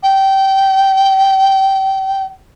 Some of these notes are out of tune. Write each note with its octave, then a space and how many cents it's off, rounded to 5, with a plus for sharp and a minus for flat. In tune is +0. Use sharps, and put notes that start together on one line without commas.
G5 -20